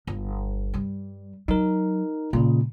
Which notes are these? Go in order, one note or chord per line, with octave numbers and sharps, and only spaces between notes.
G1
G2 G3
F#3 D#4 A#4
A#2 C#3 G#3